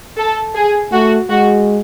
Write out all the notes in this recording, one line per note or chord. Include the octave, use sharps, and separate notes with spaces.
A4
G#4
A3 F#4
G#3 F#4